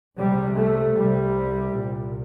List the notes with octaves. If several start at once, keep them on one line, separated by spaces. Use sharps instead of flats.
C2 C3 G3
A3
C2 C3 G3
C2 A#2